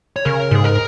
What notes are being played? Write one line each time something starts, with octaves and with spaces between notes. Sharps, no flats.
C#5
C#3 A#4
G#2 G#4
A#4